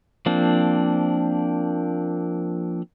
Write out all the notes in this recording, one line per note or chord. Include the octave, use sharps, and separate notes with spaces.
F3 A#3 C4 D4